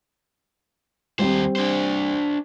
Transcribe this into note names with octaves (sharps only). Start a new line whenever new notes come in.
D#2 G3 C4 C5
D4 C5